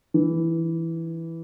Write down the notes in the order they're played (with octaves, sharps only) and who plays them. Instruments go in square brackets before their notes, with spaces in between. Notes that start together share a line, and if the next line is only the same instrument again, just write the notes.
[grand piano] E3